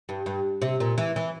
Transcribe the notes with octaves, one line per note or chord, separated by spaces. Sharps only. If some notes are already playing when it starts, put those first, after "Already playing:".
G2
G2
C3
A#2
E3
E3